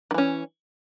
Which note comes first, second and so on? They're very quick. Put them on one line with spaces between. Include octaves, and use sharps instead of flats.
D#3 E3 C#4